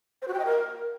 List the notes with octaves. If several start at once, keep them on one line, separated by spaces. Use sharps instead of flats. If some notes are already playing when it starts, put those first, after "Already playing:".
C5
F#4
G5
D#5
A#4